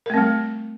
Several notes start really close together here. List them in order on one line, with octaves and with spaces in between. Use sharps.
A#4 A3 C4 G3